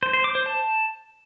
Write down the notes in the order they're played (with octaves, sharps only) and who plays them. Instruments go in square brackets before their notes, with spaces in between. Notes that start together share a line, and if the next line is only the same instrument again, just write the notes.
[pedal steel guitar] C5
C5
D6
C5
A5